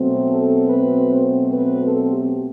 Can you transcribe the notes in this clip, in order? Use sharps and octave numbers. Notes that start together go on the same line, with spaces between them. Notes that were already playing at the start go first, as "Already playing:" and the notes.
Already playing: B2 F#3 A3 C4
A4
B4
C5
B4
A4
G4